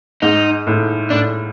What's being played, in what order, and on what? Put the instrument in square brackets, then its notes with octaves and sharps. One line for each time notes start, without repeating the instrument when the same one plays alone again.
[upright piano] G#2 [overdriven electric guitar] D#4
[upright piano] A2
[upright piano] A2 [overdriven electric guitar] D4